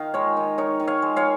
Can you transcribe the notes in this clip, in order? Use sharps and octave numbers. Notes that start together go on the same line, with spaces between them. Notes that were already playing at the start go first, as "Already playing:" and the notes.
Already playing: D#3 D#4 F5
G#3 A#4 C#5
D#3
D#4 A#4 C#5
D#3
C#5 F5
G#3
C#5 F5